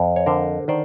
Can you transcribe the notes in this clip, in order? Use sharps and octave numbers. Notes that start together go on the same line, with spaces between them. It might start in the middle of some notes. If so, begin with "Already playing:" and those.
Already playing: F2
C#5
D3 A#4 C5
D#3 C5 D5